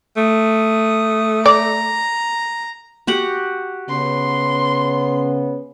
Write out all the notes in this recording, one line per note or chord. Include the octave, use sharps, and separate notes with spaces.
A3 D#6
D5 A#5
F#4 G4 F#5
C#3 B3 C6